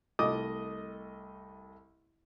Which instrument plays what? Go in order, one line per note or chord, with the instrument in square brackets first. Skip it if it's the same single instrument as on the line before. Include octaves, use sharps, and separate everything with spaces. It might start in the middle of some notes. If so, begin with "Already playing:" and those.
[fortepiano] C2 A3 D#5 D6 D#6